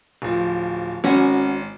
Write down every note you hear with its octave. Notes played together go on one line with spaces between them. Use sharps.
D1 F3
G#1 C#4 F#4